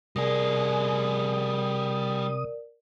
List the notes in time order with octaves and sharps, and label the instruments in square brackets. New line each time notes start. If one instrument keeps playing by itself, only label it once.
[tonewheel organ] C3 D#6 [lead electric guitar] G3 G#4 [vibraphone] A#4 D5